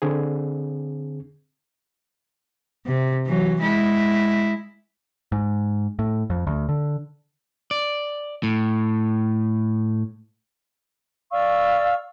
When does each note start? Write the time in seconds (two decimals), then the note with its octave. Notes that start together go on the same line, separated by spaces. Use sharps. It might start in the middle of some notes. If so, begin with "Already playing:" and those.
0.02 D3 C4 G#4
2.87 C3
3.26 E3 F#3
3.61 G#3 E4
5.32 G#2
5.99 A2
6.30 F2
6.47 D2
6.69 D3
7.71 D5
8.43 A2
11.31 D5 F5 C#6 E6